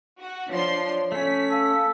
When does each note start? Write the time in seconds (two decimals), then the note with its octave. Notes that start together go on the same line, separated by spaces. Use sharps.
0.20 F#4
0.49 F3 D4 C#5 C6
1.12 A3 C#4 B6
1.51 A4 F5